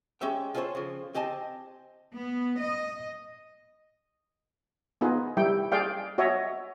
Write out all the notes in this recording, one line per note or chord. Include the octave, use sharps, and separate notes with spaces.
G#3 C#4 G4 E5 G5
F4 G#4 A4 C5 C#5
C#3 F3
C4 G4 D#5 G#5 A5
B3
D#5
B3 D#4 F4 G#4 B4
G3 E4 G5
G#4 D5 F5 G5
F#4 C#5 D#5 E5